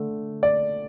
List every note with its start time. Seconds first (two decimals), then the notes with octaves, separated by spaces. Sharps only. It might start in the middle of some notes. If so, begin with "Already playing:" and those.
Already playing: D3 A3
0.43 D5